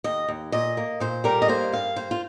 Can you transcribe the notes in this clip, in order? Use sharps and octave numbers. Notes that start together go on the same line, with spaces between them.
D#2 D#5
D#2
A#2 D#5
A#3
A#2 C5
G3 A#4
D#5
A#3 C5
G2 F5
A#3 C5
F4